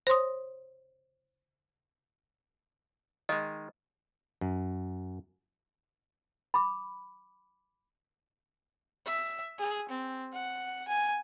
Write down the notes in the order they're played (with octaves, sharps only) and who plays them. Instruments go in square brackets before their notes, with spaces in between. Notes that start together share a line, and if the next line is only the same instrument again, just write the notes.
[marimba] C5 C#5 C6 D#6
[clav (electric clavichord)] D#3 G#3 [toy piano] D#5
[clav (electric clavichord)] F#2
[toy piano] B5 D6
[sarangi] E5
G#4
C4
F#5
G#5